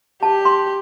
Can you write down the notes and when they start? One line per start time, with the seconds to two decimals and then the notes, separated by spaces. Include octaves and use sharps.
0.23 G4 A5
0.45 C6